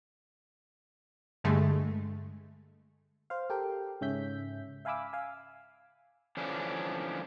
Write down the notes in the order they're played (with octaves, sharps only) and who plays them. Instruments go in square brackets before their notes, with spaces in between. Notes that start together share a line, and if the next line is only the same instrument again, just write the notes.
[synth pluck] G2 D3 G#3 A3
[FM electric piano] C5 F5
G4 A4 A#4 G5
G#2 C#3 C#4 E5 G6 B6
E5 F5 G#5 B5 D6 E6
F5 G#5
[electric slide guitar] D3 E3 F3 C#4 D4